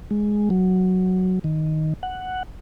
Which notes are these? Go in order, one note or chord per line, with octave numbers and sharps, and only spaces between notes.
G#3
F#3
D#3
F#5